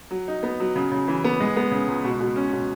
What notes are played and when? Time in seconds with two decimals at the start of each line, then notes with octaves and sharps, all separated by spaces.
0.11 F#3
0.28 D#4
0.43 B3
0.60 F#3
0.76 C#3
0.92 C#3
1.08 E3
1.24 B3
1.40 G#3
1.56 B3
1.71 C#3
1.88 C#2
2.05 B2
2.20 B2
2.36 C#4
2.53 B2